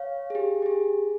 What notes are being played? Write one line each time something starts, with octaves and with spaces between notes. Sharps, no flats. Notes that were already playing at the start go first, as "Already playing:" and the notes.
Already playing: C#5 F5
G#4
G4
G4
G#4